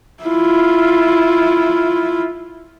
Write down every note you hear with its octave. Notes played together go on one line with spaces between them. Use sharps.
E4 F4